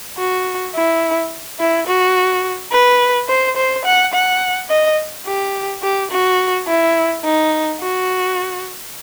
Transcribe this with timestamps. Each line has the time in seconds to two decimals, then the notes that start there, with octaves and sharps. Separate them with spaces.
0.18 F#4
0.75 E4
1.60 E4
1.87 F#4
2.72 B4
3.29 C5
3.57 C5
3.85 F#5
4.13 F#5
4.70 D#5
5.26 G4
5.83 G4
6.11 F#4
6.67 E4
7.24 D#4
7.80 F#4